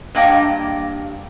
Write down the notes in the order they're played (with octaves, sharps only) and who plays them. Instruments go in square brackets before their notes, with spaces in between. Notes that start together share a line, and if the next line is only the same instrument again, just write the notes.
[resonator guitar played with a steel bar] G2 A#3 D#5 G5